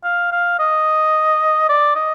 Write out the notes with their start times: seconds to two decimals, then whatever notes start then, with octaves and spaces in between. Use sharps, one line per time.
0.04 F5
0.32 F5
0.59 D#5
1.69 D5
1.95 D#5